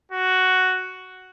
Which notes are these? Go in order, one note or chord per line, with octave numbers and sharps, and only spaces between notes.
F#4